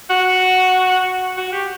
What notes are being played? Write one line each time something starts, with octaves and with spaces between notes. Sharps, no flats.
F#4
F#4
G4